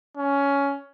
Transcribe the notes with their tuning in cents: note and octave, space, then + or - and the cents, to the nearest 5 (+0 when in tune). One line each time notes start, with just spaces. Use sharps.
C#4 +15